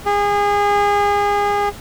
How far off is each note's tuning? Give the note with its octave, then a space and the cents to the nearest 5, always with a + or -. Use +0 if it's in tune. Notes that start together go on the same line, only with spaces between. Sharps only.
G#4 -30